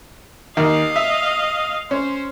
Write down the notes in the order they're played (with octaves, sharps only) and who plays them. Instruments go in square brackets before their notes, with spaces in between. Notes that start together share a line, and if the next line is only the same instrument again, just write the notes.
[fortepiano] D#2 [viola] D#5 F5
[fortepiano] E5
[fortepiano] C#4 [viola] C5